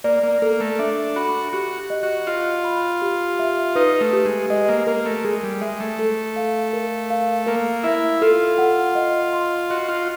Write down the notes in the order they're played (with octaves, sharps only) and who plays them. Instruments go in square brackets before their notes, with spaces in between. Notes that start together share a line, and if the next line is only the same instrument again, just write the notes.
[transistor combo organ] A#3 [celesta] D5
[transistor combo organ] A#3
[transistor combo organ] A#3 [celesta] A4
[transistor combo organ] A3
[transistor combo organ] D4 [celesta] E5
[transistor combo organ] F#4 [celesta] B5
[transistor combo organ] F#4 [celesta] G4
[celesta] D#5
[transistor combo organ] F#4
[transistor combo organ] F4 [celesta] D#5
[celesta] B5
G4
E5
[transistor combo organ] D#4 [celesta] B4
[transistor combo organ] A3
[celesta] G4
[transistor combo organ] G#3
[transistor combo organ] G#3 [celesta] D#5
[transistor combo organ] A#3
[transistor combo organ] A#3 [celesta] A#4
[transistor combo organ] A3
[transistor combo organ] G#3 [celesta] G#4
[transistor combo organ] G3
[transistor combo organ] G#3 [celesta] E5
[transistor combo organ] A3
[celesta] A4
F5
A#4
F5
[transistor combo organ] A#3 [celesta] A#4
[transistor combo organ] E4 [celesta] E5
[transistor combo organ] F4 [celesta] A4
[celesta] F#5
D#5
C6
[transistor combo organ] F#4 [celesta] D#5
[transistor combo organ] F4